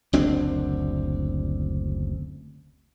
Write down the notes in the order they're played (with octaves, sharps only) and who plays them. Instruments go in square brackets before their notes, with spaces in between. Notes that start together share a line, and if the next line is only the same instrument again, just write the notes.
[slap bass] F#1 D2 C4 D4